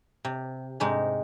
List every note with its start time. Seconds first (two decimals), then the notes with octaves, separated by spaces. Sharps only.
0.25 C3
0.80 G#2 C3 G#3 D#4